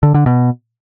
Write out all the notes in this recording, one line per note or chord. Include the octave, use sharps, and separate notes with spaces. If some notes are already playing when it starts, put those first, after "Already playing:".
D3
D3
B2